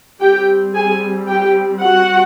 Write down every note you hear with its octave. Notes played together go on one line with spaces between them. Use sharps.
G3 C4 G4 G5
G#4 G#5
G4 G5
F#4 F#5